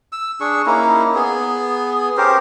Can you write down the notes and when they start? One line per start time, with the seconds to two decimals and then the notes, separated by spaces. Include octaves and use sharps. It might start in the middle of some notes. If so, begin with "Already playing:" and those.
0.12 E6
0.40 D4 G#4 C#6
0.66 A#3 C#4 D#4 E4
1.15 B3 G#4
2.17 C#4 G4 A#4 C5